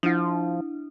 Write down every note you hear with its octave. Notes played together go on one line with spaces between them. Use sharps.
F3 D4 E4